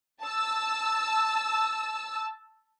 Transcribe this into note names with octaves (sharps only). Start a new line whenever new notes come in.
A5 E6